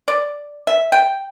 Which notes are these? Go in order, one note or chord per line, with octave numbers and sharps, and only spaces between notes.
D5
E5
G5